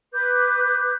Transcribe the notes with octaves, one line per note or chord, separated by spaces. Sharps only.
B4 D6 F#6 G6